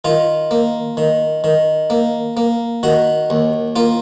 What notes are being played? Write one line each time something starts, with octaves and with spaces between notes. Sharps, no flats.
D#3 F4
A#3
D#3
D#3
A#3
A#3
D#3 F#4
D#2
A#3 F4